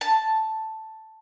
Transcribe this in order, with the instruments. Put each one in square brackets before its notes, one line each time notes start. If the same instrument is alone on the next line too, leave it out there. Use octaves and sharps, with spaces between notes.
[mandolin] A5